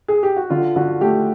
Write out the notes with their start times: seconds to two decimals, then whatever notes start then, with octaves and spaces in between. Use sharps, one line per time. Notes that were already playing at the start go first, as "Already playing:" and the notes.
0.08 G#4
0.23 G4
0.37 F#4
0.50 D3 F4
0.76 D3 F#4
1.01 A3 G4